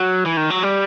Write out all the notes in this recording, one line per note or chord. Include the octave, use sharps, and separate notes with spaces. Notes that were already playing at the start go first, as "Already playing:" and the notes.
Already playing: F#3
E3
D#3
F#3
G3